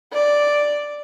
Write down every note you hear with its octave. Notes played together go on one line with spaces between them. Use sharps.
D5